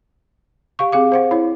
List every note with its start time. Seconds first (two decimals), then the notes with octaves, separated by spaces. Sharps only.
0.79 G4 F5 C#6
0.92 C4 G#4 F5 D6
1.12 C5 F5 F#5
1.31 E4 C#5